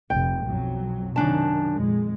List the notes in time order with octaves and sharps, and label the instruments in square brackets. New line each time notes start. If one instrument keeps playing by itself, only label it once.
[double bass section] F1 [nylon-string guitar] G5
[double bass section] B1 F2 F#3
[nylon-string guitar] F#2 D4 A5 [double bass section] C3 D#3
[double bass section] F2 A#2 G#3